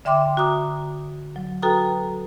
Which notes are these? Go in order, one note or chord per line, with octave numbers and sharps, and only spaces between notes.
D3 E5 G5 C6 D6
F#4 A#5 D6 D#6
F#3
F#4 A4 B4 G5 A#5 D#6